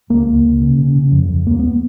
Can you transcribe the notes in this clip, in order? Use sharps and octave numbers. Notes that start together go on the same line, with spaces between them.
C#2 A#3
C#2
C#2
C#3
C#3
C#3
F2
F2
D#2 A#3
B3